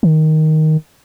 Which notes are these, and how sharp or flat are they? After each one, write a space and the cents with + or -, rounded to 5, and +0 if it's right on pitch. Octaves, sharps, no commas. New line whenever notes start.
D#3 +5